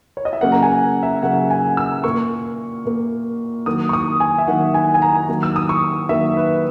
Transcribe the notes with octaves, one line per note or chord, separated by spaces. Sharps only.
C#5
D#5
E5
C#3 F#3 A#3 F#5
A#5
G#5
E5
C#3 F#3 A#3 F#5
G#5
E6
A#2 A#3 C#6
A#2 A#3
D#3 F#3 A#3 D#6
C#6
D#6
G#5
E5
D#3 F#3 A#3 F#5
G#5
G#5
A#5
D#3 F#3 A#3
E6
D#6
C#6
D#3 F#3 A#3 E5
B4